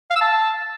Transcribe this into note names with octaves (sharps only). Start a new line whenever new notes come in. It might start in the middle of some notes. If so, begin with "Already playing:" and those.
F5
E6
A5